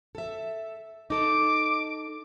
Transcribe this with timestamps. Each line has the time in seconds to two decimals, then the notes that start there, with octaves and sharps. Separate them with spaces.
0.15 A4 E5
1.10 D#4 A4 D6